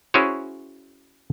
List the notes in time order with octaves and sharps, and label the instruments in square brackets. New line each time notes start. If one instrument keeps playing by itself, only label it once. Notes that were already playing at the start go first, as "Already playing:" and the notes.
[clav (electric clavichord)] C#4 E4 F#4 G#4 C5 C#5